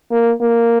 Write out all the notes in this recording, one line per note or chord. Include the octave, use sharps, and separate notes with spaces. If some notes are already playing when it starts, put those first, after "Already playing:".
A#3
A#3